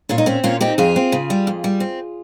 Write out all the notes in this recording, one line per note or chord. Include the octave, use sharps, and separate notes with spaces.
A#2 C#4 F4
D#4
C4 C#4
A#2 C#4 F4
C4 D#4 G4
F2 F4 G#4
C4
C#3
G3
F2
G3
C4